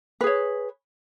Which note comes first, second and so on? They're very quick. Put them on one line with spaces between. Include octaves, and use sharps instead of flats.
B4 G#4 C#5